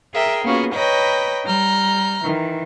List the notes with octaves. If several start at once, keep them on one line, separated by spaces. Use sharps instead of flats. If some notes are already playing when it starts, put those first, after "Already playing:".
G#4 A#4 E5 G5
A#3 B3 C#4 F4 F#4 G#4
B4 C#5 D#5 G5 A#5 B5
G3 A#5 F6 G6
D#3 E3